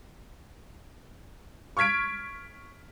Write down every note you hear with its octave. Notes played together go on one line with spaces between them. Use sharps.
C#6 F6 G#6 B6 D7